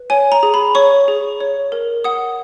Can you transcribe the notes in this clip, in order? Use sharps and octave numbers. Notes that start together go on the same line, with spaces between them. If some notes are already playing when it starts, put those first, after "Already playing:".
Already playing: B4
C#5 G#5
A#5
G#4
B5
C#5 C#6
G#4
C#5
A#4
F#5 D#6